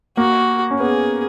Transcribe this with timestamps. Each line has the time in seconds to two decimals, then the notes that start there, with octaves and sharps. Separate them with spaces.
0.17 A#3 F#4
0.71 C#4
0.80 B3 G#4